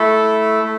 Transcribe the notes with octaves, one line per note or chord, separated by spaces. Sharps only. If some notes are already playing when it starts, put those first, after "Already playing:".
Already playing: A3 E4 A4
A3